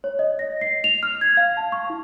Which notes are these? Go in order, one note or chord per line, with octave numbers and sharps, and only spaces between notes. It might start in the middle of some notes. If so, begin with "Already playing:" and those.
C#5
D#5
A#6
C7
F7
F6
G#6
F5
A5
C#6
E4